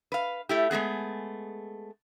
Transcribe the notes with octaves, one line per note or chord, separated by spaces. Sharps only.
B4 F5
A3 E4 G4
G#3 A3 B3 G#4